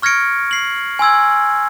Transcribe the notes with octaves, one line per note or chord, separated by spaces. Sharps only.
C#6 F6 G#6 A#6 C#7 D7
C7 F#7
G#5 C6 E6 G#6